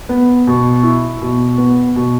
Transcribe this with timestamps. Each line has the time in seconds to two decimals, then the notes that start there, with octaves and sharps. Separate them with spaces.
0.09 B3
0.47 B2
0.83 E4
1.22 B2
1.58 B3
1.96 B2